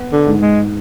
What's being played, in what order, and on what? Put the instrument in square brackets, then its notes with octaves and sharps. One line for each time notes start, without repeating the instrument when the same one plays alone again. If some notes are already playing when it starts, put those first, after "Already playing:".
Already playing: [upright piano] B3
[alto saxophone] D3
[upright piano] G#2
[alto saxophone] G#3